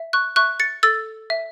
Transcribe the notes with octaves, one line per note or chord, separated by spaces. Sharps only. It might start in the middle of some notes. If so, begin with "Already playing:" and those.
Already playing: E5
C#6 F#6
E5 C#6 F#6
A6 C#7
A4 E6 A6
E5